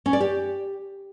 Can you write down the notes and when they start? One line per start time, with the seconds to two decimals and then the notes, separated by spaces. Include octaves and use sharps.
0.06 C#4
0.13 D5
0.20 G4